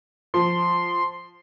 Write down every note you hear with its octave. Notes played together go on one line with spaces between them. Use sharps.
F3 C6